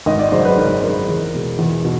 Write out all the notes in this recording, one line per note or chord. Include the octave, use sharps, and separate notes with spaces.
G#1 D#5
D5
F#2 C#3 C5
B4
G#1 A#4
F#2 C#3 A#4
E2
B2 G#3
E2
B2